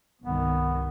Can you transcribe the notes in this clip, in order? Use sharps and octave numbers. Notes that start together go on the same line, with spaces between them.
C2 G2 D#3 B3